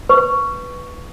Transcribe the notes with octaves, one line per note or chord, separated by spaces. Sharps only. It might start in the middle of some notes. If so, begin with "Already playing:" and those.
B4 C#6